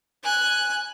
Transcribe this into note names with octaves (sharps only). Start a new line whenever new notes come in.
G#5 F#6